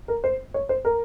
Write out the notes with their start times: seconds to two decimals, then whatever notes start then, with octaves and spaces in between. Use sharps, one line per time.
0.08 A#4
0.24 C5
0.54 C#5
0.69 C5
0.85 A#4